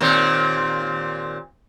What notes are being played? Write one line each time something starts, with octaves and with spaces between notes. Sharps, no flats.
D#2 A#2 C4